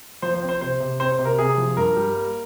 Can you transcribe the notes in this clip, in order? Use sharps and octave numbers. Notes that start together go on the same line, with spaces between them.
F3 C5
C5
C4
C5
C3 C5
C3
C4 C5
C5
C3
A#4
C3 G#4
F3
G2 A#4
G3
A#3